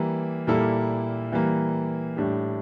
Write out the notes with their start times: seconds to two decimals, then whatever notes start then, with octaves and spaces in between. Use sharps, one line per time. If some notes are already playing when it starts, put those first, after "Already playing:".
Already playing: E3 G3 A#3
0.47 A#2 G3 A#3 E4 A4
1.32 E3 G3 A#3
2.17 A2 G3 D4 G4